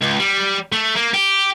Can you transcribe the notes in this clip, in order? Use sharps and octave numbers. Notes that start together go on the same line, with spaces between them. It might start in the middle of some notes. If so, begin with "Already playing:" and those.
C#2
G3
A3
A#3
G4